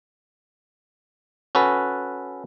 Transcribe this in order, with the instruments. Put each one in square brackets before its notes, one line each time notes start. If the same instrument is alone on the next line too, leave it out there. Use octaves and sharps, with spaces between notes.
[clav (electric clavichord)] C#4 F#4 A4 B4